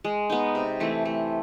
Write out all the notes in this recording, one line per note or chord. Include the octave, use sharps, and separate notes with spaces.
G#3
B3 D#4
C3
E3 A3 C4
A3